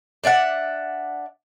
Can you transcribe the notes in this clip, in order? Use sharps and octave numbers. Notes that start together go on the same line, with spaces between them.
D4 D5 E5 F#5